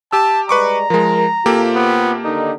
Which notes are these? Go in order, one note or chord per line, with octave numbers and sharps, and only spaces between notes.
G4 A5 E6
G3 G#3 B4 D5 A#5 C#6 D6
F3 G#3 A#4
C3 A#3 F4 G4 A4
B3
D3 D#3 D#4